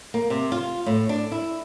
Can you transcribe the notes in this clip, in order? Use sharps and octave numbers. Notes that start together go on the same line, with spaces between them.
A#3
C3
F4
A2
D4
E4